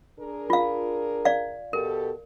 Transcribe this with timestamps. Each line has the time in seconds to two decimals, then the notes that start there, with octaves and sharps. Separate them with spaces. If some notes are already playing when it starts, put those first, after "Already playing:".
0.19 D4 G#4 A#4
0.50 F4 F5
1.25 D5 F5
1.73 B2 G4 A4 A#4